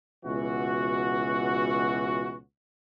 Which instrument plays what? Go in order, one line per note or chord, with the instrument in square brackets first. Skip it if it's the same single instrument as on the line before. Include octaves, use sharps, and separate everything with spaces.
[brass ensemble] C#2 B2 E3 F#4